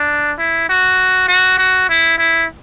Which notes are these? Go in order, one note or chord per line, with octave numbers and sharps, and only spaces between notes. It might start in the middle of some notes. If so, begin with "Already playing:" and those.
Already playing: D4
E4
F#4
F#4
F#4
E4
E4